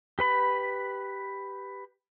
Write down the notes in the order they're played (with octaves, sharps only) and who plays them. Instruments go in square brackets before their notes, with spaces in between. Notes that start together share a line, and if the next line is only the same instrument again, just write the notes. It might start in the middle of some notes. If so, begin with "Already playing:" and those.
[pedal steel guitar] G4 B4 B5